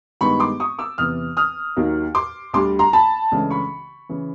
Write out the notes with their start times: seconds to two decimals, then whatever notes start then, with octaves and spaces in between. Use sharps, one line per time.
0.21 G2 D#3 G#3 B3 B5 C#6
0.40 C6 D6
0.60 C#6 D#6
0.79 D6 E6
0.98 E2 C3 E3 D#6 F6
1.37 D#6 F6
1.76 D#2 D#3 F#3 A#3
2.15 C6 D6
2.53 D2 D3 G3 C6 D6
2.79 A#5 C6
2.93 A5 B5
3.32 C#2 C#3 E3 A3 D4
3.51 B5 C#6
4.09 C#3 E3